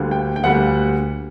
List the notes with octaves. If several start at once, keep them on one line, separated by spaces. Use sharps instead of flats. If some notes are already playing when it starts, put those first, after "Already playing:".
Already playing: D2 D3 G3 A#3
G5
G5
D2 D3 G3 A#3 F#5